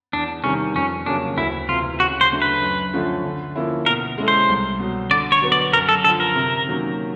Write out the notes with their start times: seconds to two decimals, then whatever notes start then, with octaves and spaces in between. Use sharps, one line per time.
0.13 E2 D4
0.44 C3 D#3 G3 C#4
0.75 F2 C#4
1.06 C#3 F#3 A#3 C#4 D4
1.37 D2 E4
1.69 C3 E3 F4
2.00 C#3 F#4
2.21 C5
2.31 F#3 A3 D4
2.42 B4
2.62 F#2
2.93 D3 F3 A3 C#4
3.24 D3
3.55 F3 A#3 C#4 E4
3.86 B2 A#4
4.18 G#3 C#4 E4 A4
4.28 C5
4.49 C2
4.79 B2 F#3
5.11 D3 D5
5.32 C#5
5.42 F#3 B3
5.52 D5
5.73 F#2 A#4
5.89 A4
6.04 D3 A4
6.08 F3
6.20 A#4
6.35 C3
6.67 D#3 F#3 A#3 C#4